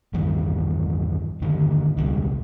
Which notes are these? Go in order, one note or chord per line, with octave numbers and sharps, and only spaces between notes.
E2 G2 D#3
F2 D3 D#3
E1 C#2 C#3 G3